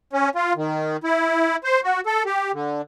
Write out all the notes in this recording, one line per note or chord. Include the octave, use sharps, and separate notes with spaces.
C#4
F4
D#3
E4
C5
F#4
A4
G4
D3